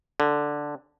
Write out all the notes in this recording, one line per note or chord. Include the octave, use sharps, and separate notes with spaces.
D3